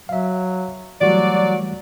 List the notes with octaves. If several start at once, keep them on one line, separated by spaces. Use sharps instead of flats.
F#3 E5 F5
E3 F#3 G3 A3 F#4 D5